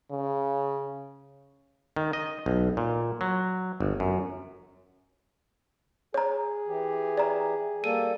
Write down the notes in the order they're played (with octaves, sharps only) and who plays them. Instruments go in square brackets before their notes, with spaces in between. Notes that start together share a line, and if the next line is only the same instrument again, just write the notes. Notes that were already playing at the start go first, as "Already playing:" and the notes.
[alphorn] C#3
[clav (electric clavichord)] D#3
D#5
B1
A#2
F#3
G1
F#2
[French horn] G#4 [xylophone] C#5 A#5
[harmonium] E3 G4
[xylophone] D5 A#5
[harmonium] G3 A#3 A4 [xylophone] D#7